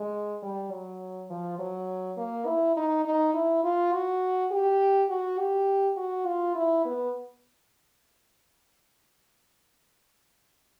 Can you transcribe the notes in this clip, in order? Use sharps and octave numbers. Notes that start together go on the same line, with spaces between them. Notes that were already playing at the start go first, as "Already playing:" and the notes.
Already playing: G#3
G3
F#3
F3
F#3
A#3
E4
D#4
D#4
E4
F4
F#4
G4
F#4
G4
F#4
F4
E4
B3